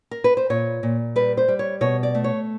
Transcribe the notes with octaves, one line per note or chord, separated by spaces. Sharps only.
A#4
B4
C5
A#2 C#5
A#2
G3 B4
C5
G3
C#5
B2 C#5
D5
A3
C#5